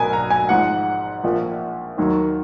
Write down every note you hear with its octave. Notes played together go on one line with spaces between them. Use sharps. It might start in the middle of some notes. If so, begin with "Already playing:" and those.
Already playing: B1 B2 F#3 A#4 G#5
A#5
G#5
G#1 G#2 F3 F#5
A#1 A#2 F3
D#2 D#3 F#3